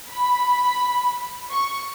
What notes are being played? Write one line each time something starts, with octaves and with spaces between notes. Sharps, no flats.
B5
C#6